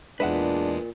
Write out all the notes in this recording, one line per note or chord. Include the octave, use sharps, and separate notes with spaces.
E2 A#2 G#3 D4 B4 E5 F#5